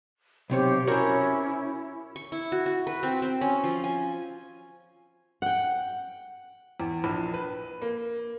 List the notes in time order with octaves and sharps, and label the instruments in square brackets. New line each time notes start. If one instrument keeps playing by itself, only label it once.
[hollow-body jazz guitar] B1 C3 C#5 [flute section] G4 C5
[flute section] C#4 E4 [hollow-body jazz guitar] F#4 A#4 C#5
[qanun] C#6
E4
F#4
F#4
B4
C4
C4
C#4
F3
G#5
[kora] F#5 G5
[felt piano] E2
A#1
B4
A#3